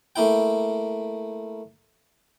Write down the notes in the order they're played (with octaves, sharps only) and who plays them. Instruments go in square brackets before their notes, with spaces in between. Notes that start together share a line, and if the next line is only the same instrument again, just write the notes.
[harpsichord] A3 A#3 E4 G5